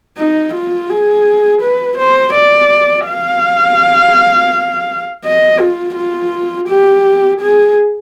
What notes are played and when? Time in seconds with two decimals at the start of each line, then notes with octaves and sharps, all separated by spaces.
0.17 D#4
0.54 F4
0.90 G#4
1.61 B4
1.98 C5
2.34 D5
3.06 F5
5.24 D#5
5.59 F4
5.96 F4
6.68 G4
7.40 G#4